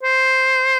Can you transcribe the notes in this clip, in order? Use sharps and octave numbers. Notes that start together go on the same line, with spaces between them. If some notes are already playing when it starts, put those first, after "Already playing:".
C5